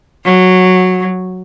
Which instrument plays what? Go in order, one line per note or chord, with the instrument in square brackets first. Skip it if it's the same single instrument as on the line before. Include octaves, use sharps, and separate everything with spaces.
[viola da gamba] F#3